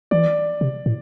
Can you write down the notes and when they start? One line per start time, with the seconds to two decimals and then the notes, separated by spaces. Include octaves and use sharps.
0.11 E3 D5
0.61 C3
0.86 A2